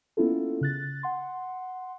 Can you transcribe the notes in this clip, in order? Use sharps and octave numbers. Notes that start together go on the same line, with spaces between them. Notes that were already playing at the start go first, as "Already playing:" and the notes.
A#3 B3 C#4 E4 F4 A4
C#3 F#6 A6
F#5 C6